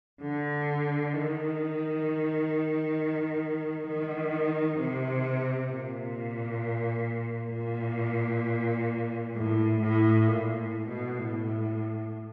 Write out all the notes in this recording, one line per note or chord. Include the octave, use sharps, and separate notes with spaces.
D3
D#3
D#3
C3
A#2
A#2
A2
A2
A#2
A2
B2
A2